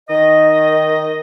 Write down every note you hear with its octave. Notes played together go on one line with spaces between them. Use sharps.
D#3 D#5